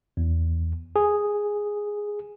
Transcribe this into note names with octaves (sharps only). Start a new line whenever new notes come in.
E2
G#4